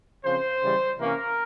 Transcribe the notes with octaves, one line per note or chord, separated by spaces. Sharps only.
C#3 F3 C4 C5
C#3 E3 G3
C3 E3 A#3 C#4 A#4